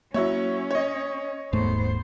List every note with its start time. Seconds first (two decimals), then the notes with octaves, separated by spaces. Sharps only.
0.14 F#3 A#3 C#4 E4 C#5
0.71 C#5 D#5
1.53 D#1 G#2 A3 B3 C5